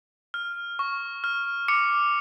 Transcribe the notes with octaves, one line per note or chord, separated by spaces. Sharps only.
F6
C#6
F6
D6 C#7